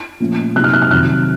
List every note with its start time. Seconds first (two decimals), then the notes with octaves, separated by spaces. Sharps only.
0.20 A#2 F3 A3 C#4
0.55 C3 F#3 A#3 D#4 F#6
0.64 F6
0.73 F#6
0.82 F6
0.91 F2 C3 D#3 F#3 C4 F#6